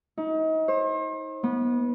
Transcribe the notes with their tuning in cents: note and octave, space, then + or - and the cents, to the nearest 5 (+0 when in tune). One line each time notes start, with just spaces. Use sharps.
D#4 +35
C5 +40
B3 -25